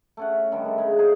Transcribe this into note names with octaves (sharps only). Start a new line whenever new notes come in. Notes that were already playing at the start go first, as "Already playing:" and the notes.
A3 C#4 F#5
D3 D#3 G3
A3
C#3 G#3
D#4 G#4 C5